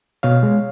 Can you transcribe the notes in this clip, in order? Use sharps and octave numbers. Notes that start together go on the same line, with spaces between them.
B2 C#5 F5
G#3